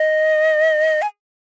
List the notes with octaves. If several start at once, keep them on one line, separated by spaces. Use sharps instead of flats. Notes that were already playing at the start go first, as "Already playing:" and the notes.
Already playing: D#5
G#5